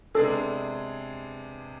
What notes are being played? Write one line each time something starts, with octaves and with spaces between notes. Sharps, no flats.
C3 G#3 B3 D4 G#4 A4